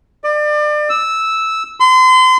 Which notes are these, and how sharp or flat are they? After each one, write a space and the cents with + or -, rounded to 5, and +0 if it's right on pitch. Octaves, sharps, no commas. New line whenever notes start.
D5 +30
E6 -10
C6 -35